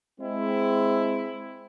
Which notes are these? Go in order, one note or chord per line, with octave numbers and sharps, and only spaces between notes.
G#3 C4 E4